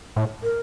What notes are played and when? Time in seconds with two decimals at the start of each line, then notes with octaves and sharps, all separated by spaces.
0.16 A2
0.43 A#4